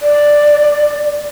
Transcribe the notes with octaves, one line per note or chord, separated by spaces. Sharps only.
D5